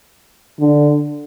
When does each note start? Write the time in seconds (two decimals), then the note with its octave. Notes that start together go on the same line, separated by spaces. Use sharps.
0.60 D3